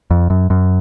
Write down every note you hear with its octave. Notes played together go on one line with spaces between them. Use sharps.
F2
F#2
F#2